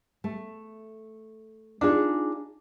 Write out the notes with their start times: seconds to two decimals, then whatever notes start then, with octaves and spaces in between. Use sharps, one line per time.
0.24 A3
1.81 D4 D#4 F4 G#4